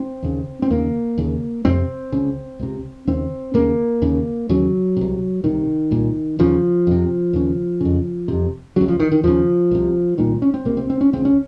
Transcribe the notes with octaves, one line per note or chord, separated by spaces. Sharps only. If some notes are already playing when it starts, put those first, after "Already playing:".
Already playing: C4
D#2 C#3
C4
D#2 C#3 A#3
D#2 C#3
F2 C3 C4
C#2 C#3
C#2 C3
D#2 C#3 C4
D#2 C#3 A#3
D#2 C#3
D#2 C#3 F#3
C2 C3
C2 C3 D#3
C2 A#2
D#2 C#3 F3
F2 C3
D#2 C#3
F2 C#3
F2 C3
C#2 C#3 F#3
F3
D#3
D#3
D#2 C#3 F3
C2 C3
C2 A#2 D#3
C#4
C4
C#2 C3 A#3
C4
C4
C#4
C#2 C#3 C4
C#4